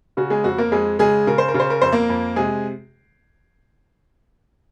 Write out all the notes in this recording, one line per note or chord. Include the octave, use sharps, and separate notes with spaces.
C#3 F#4
G#3 G#4
F2 F#4
A#3 A#4
F2 G#3 G#4
C#3 G#3 G#4
C#3 A#4
C5
A#4
C#3
C5
A#4
F2 C5
A#3 A#4
F2
C3 G#3 G#4